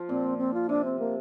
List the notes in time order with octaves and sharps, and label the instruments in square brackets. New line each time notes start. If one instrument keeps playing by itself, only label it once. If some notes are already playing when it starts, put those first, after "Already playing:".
Already playing: [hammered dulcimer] F3
[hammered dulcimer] A#2 [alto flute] C4
[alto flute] C4
F4
[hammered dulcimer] C3 [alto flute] D4
[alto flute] C4
A#3